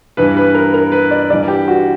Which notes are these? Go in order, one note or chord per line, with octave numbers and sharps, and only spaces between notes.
G2 E3 B4
B4
A#4
A#4
B4
D5
G2 E3 D5
G4
F#4